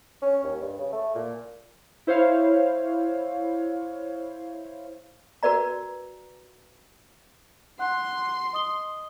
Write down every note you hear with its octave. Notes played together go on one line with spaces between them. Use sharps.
C#4
D#2
G2
C#3
A3
A#2
E4 C5 C#5 F5
F#4 A#4 B4 D5 A#5
F#5 C6 F#6
D#5 D#6 G7